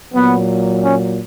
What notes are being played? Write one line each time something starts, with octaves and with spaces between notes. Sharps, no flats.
A#2 F#3 B3
C#4